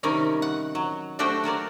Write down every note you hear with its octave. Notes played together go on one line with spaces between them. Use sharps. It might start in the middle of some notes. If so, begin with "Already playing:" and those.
C3 D#3 G3 C4 C#4 A#4
F#5
F#3
A3 D4 F#4 G4 C5 G5
F#3 F#4 A#4 D5